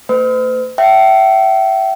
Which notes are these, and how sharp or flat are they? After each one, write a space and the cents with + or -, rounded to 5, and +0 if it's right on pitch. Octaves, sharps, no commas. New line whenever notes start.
A3 +45 C5 -45
E5 +15 G5 -35